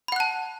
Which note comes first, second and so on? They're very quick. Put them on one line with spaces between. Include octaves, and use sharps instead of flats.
B5 F#5 F#6 A5